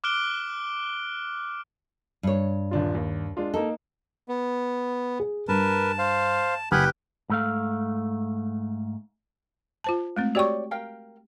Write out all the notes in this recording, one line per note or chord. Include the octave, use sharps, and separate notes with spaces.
D6 F6 F#6 D7 G7
G2 C#5
D#1 D4 F4
D#2
G#3 D4 F4
A#3 D#4 A4
B3
G#4
G2 A#4 B4 A5
C5 F5
F#1 G4 B4 F#5 G#5 B5 D#6 F6
G#2 A3 F5
F4 C5 A5
G#3 A3 C4
F#4 G4 C#5 D5 G5 C#6
A#4 F5 G5